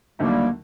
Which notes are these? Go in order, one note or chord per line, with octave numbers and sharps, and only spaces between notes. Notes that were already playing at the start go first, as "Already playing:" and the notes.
D#2 D3 F#3 G3 A3 A#3 D#4